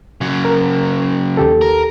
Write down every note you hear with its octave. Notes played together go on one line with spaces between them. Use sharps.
C#3 F#3
A#4
D#2 G4 A4
A#4